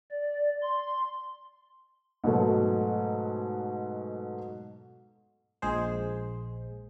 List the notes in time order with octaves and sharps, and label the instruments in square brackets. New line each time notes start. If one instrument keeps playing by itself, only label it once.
[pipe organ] D5
C6
[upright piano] G#2 B2 F#3 A3
[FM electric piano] A#1 G#3 G#4 C5